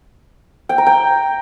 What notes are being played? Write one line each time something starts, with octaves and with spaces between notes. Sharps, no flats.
G5
A#5
G5